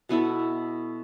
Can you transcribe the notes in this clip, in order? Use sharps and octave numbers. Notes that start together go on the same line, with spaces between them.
B2 B3 E4 A4